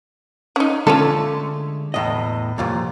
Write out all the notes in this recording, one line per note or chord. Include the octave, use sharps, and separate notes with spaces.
C#4 D#4
D3 G#3 A3 C#4 F4 A4
E2 A2 D#5
C2 F2 A#2